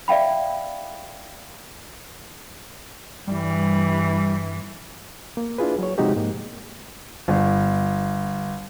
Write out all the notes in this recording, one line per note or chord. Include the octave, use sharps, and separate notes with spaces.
D5 E5 F5 G5 B5
G2 E3 G3
A#3
D4 E4 F4 G#4 B4
F#3 C#5
C3 F3 G#3 D#4 F#4 G4
G#2 A#3
G1